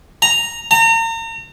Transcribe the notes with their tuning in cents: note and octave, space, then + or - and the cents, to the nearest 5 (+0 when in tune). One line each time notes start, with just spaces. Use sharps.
A#5 +0
A#5 -40